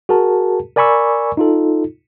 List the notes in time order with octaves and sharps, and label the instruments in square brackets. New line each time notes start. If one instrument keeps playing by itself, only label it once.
[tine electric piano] F#4 G#4 A#4 A5
A#4 D5 G#5 B5 C#6 E6
D#4 F4 A4